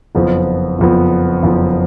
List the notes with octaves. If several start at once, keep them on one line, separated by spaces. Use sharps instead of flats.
F#1 F2 F3 B3
F#1 F2 F3 B3
F#1 F2 F3 B3